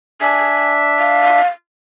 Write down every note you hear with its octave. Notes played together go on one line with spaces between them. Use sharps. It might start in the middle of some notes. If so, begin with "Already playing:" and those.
D4 E5 G#5
F5